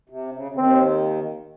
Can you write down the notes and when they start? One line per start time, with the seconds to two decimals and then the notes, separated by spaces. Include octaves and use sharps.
0.09 C3
0.33 C#3
0.52 C#3
0.56 D#2 D#3 C4